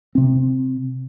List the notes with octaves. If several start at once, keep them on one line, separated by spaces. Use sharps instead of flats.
C3 C4